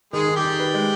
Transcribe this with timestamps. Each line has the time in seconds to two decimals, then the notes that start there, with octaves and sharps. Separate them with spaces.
0.13 D#3 G#3 G#4
0.28 D#3
0.36 G3 G4
0.44 D#3
0.60 B4
0.74 G#3